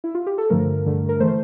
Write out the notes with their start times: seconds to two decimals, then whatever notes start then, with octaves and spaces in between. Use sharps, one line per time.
0.04 E4
0.15 F4
0.27 G4
0.38 A4
0.50 G2 D3 F3 A3 A#4
0.86 G2 D3 A3
1.09 A#4
1.20 E3 A3 C5